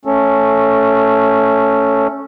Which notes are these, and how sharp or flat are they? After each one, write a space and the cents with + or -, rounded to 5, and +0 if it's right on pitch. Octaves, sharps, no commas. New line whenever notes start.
A3 +0 C#4 +0 A4 +0